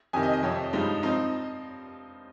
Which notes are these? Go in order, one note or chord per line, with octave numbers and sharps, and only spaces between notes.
F2 C3 D#3 G#5
D#5
D#5
F2 C3 F3 C#5
G2 F3 G#3 D#4
F3 C4 D#4 D#5